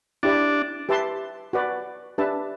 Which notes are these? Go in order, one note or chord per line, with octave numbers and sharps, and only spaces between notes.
D4 E4 G4 D5
G4 B4 E5 A5 C6
F#4 B4 D5
D4 G4 B4 E5 A5